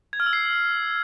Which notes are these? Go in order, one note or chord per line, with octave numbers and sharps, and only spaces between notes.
G#6
F6
E6
C7